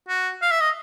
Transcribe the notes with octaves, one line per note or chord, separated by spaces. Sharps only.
F#4
F5
E5
D#5